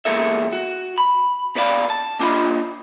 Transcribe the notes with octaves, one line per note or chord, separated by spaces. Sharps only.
E2 F#3 G#3 A#3 A4 E5
F#4
B5
B2 B4 D5 F5 B5
A5
A#2 D4 F4 D#5 B5